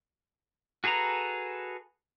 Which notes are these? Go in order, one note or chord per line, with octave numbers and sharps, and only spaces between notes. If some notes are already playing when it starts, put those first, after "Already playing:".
F#4 G#4 A4 B4 A#5